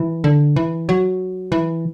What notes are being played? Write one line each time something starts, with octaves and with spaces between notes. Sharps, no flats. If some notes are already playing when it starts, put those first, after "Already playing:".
Already playing: E3
D3
E3
F#3
E3